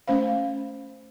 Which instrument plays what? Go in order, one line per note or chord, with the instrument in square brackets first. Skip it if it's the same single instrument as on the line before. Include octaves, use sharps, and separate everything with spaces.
[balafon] A3 C#4 C5 F5